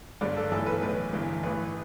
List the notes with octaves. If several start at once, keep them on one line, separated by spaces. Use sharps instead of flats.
G1 G2 D3 D5
A4
B1 A2 E3 A4
B4
B1 A2 E3 B4
G1 G2 E3
A1 A2 E3 B4